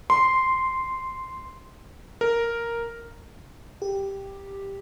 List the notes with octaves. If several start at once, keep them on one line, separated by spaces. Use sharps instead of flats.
C6
A#4
G4